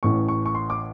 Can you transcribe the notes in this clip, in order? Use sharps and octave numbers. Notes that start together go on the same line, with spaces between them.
A1 A2 E3 C#6
C#6
C#6
C6
D6